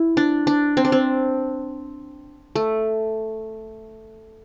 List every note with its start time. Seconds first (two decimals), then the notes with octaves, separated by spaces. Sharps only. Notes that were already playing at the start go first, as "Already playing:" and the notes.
Already playing: E4
0.17 D4
0.47 D4
0.77 C4
0.85 D4
0.92 C4
2.55 A3